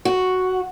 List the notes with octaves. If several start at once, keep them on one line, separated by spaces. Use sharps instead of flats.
F#4